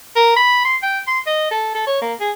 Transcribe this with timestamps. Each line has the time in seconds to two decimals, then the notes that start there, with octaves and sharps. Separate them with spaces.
0.16 A#4
0.36 B5
0.65 C6
0.82 G5
1.07 C6
1.27 D#5
1.51 A4
1.75 A4
1.87 C#5
2.01 A#3
2.21 G#4